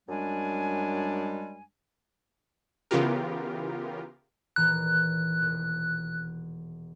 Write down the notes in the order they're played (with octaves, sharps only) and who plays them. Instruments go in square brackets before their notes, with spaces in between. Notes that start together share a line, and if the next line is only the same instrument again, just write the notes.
[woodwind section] F#2 G3 G#3 D4 G#5
[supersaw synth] C#3 E3 B3 F4 G4 A#4
[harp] D#1 E3 A#5 [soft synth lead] F#6
[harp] E1